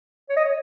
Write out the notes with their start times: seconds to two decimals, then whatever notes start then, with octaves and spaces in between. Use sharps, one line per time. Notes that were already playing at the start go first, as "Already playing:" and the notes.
0.29 C#5
0.37 D#5
0.45 C#5